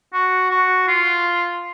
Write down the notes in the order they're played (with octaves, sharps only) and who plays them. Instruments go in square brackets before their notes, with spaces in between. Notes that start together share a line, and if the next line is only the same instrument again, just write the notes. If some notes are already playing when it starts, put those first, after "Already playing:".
[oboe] F#4
F#4
F4